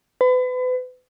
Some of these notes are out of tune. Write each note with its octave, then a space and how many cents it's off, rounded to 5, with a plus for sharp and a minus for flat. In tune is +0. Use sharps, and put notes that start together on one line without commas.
B4 +35